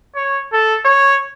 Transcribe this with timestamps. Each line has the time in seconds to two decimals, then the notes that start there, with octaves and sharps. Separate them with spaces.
0.15 C#5
0.53 A4
0.85 C#5